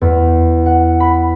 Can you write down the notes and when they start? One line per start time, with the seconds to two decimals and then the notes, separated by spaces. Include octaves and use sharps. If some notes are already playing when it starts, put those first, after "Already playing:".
0.01 E2
0.66 F#5
1.00 B5